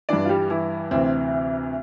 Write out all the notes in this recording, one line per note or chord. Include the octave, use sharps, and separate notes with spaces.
G2 E3 D4 D5
F4
G3 G4
E3 E4
D2 C3 E3 C4